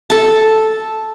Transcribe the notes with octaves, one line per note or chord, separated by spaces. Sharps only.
A4 A5